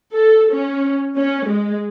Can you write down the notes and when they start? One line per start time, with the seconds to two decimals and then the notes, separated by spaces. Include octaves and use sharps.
0.14 A4
0.52 C#4
1.16 C#4
1.46 G#3